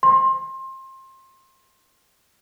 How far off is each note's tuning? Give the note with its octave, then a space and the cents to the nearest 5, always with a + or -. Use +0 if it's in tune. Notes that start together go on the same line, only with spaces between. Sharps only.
C6 +25